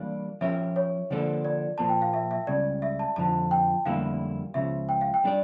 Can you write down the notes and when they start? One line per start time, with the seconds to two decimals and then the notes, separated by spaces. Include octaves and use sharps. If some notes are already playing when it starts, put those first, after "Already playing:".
Already playing: E3 G3 A#3 D4 F5
0.41 F3 C#4 G4 A#4 E5
0.76 C#5
1.10 D3 F3 A#3 D4 A4
1.45 D5
1.78 A#2 F3 A#3 A5
1.89 G5
2.02 F5
2.13 E5
2.31 E5
2.47 C#2 C#3 G3 D5
2.82 E5
2.99 A5
3.16 F2 D3 F3 A5
3.51 G5
3.85 F2 D3 G3 A#3 E4 F5
4.54 C#2 C#3 F3 E5
4.89 G5
5.01 F5
5.14 G5
5.24 G3 D4 A4 D5